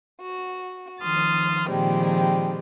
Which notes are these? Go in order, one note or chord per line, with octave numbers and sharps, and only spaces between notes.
F#4
D#3 F3 C6 D#6 F6 A6
A#2 D#3 F3 G3 G#3 C4